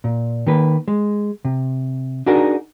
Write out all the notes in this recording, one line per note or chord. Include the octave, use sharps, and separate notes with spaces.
A#2
D#3 A#3 B4
G#3
C3
D4 D#4 F#4 G#4 A#4